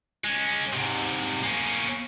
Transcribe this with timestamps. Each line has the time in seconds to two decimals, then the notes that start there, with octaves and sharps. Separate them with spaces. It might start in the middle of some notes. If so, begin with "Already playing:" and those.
0.24 G#3 C#4
0.73 G#2 C3
1.43 A#3 C#4